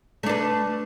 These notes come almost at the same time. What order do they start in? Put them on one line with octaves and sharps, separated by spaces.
A3 D4 B4